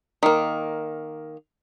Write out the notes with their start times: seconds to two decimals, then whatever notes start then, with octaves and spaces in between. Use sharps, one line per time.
0.23 D#3 A#3